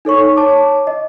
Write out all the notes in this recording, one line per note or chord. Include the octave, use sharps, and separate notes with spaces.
D#4 A4 C#5 C#6
C#5 A5 D6
D#5